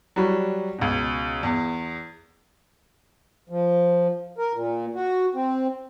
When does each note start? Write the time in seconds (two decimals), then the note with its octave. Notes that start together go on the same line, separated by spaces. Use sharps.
0.16 F#3 G3 C#6
0.78 C#2 B2
1.43 E2
3.50 F3
4.38 A#4
4.54 A#2
4.95 F#4
5.35 C4